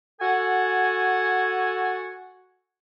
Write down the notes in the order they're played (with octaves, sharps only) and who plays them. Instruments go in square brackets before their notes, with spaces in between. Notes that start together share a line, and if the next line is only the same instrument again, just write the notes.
[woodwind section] F#4 A4 F#5 G#5